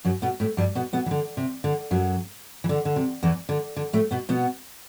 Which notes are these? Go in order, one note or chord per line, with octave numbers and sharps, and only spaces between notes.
F#2 F#3
B2 B3
A2 A3
G2 G3
B2 B3
B2 B3
E3
D3
C3
D3
F#2 F#3
E3
D3
D3
C3
E2 E3
D3
D3
A2 A3
B2 B3
B2 B3